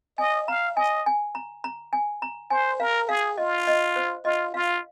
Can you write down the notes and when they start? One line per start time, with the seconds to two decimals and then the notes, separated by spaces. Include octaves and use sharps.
0.18 D#5 G#5
0.48 F5 A#5
0.76 D#5 G#5
1.06 G#5
1.35 A#5
1.64 A#5
1.93 G#5
2.22 A#5
2.50 C5 G#5
2.80 A#4 F5
3.08 G#4 F5
3.38 F4 D#5
3.67 D#5
3.96 C5
4.25 F4 D#5
4.54 F4 F5